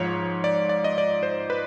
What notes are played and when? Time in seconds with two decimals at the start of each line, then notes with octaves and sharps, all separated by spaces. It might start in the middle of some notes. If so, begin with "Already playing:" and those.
Already playing: G#2 F3 C#5
0.44 D5
0.69 D5
0.84 D#5
0.98 D5
1.23 C5
1.50 B4